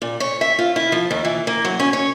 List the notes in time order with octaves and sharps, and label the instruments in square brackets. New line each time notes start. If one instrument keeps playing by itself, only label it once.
[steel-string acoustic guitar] A#2
C#5
E5
F4
E4
F3
D#2
E3
A#3
F#3
C#4
C#5